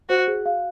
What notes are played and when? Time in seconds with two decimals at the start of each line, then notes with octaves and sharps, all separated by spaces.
0.09 F#4 C5
0.28 G#4
0.46 F5